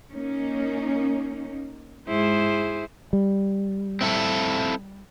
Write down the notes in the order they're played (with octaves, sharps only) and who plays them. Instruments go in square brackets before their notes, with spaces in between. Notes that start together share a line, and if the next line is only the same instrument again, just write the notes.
[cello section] A#3 C#4 D#4
[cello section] G#2 [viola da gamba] E4 G#4 C5
[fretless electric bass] G3
[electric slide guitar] C4 E4 A4